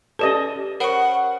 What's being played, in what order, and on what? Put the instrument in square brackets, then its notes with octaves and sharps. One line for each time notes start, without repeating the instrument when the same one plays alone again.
[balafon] C#4 G4 B4 [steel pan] A4 D5 D#5
[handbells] A#4 C5 C#5 [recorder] F#5 [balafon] B5 C#6